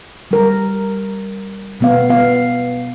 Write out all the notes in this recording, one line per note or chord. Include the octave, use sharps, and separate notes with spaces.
G3 A#4
B2 B3 F5
B3 F5